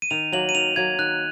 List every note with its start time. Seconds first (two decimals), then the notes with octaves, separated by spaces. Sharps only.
0.02 D#7
0.11 D#3 F7
0.32 F#3 A#3 F#7
0.49 D#7
0.55 D#3 F7
0.76 F#3 A#3 G#6
0.99 D#3 F#6